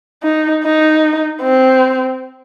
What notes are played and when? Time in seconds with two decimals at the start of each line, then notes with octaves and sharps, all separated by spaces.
0.24 D#4
0.64 D#4
1.41 C4